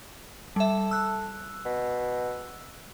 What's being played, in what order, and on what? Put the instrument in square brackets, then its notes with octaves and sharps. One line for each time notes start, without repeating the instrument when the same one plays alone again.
[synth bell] G3 E5 [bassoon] A4
[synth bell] E6 F#6
[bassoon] B2